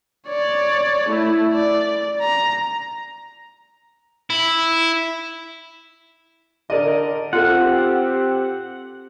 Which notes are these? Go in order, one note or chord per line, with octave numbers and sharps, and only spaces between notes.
C#5 D5
A3 E4
D5
A#5
E4
D3 A#4 D5 D#5
C4 F4 G4 A4 F#5